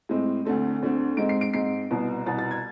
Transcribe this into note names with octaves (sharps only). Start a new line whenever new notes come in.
A2 G#3 C4
D2 D3 A3 C4
D2 D3 A3 C4
G#2 G#3 C4 D7
C7
D7
G#2 G#3 C4 C7
C2 B2 B3
C2 B2 B3 A6
A6
G#6